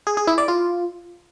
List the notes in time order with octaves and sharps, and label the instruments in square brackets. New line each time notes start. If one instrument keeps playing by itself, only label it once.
[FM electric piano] G#4
G#4
E4
D5
F4